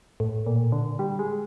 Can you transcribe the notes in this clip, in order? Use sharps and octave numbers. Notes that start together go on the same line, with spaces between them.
A2
A#2
D3
G3
G#3